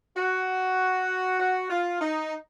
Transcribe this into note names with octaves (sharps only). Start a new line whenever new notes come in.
F#4
F#4
F4
D#4